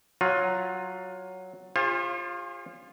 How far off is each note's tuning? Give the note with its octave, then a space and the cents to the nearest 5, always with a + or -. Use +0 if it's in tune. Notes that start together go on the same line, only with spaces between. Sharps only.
F#3 +0 F4 +20
F4 +0 G#4 -45 C5 +45